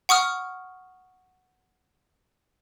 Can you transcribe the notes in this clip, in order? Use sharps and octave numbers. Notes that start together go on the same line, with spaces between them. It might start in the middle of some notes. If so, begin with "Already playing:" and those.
F#5 C#6 D#6 F6